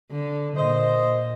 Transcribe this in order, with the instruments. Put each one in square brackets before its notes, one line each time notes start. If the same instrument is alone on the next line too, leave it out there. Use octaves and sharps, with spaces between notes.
[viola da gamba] D3
[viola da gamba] A#2 [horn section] C5 D#5